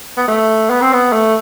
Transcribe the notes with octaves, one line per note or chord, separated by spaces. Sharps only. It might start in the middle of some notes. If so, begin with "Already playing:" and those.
B3
A3
B3
C4
B3
A3